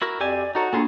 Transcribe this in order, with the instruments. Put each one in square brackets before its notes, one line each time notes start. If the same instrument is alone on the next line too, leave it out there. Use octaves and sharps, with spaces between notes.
[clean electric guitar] E4 F#4 A#4
[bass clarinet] F2 [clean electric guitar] G4 E5 G#5 [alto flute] D5
[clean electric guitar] D#4 A4 C#5 [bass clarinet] F#4 [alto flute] A#5
[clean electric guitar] A3 F4 G#4 [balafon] A#3 D4